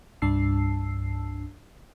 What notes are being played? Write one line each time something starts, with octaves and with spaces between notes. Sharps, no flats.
C2 G2 D4 A5 E6 C7